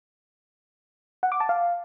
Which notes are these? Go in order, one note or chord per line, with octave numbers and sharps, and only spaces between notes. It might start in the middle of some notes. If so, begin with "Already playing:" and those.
F#5
D6
A5
F5